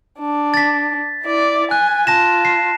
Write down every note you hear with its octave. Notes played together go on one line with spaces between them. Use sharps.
D4
A6 B6
E4 D5
G#5 F#6
F4 A5 A#6 E7
C7